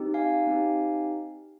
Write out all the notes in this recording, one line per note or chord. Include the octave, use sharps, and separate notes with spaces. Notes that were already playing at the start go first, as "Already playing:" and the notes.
Already playing: C4 D#4 G4
F5 G#5
C4 D#4 G4